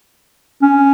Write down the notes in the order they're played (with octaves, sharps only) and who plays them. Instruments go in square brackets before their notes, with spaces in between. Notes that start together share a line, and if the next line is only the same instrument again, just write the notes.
[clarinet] C#4